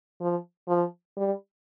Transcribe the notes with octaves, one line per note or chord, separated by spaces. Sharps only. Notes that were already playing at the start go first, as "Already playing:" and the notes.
F3
F3
G3